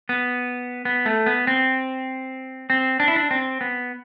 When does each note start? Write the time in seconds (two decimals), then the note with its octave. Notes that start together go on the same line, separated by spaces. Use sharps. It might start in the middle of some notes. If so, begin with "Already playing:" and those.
0.09 B3
0.85 B3
1.06 A3
1.26 B3
1.47 C4
2.70 C4
3.00 D4
3.08 E4
3.16 D4
3.31 C4
3.61 B3